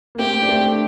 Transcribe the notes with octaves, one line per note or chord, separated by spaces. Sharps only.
A#3
A3 C4 G4
D4
A3 C4